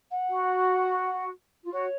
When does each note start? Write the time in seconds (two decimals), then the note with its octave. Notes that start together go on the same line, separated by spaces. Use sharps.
0.11 F#5
0.29 F#4
1.64 F4
1.72 F#4 C#5